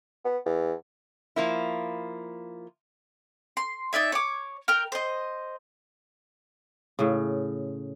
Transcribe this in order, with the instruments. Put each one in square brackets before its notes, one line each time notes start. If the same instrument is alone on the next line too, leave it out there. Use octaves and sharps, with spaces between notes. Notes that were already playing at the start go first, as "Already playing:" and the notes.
[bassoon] B3
E2
[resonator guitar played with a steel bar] F3 A#3 E4
[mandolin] C6
D#4 D5 E5 G#5
C#5 D6
A#4 G5 F6
C5 D#5
[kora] A2 C#3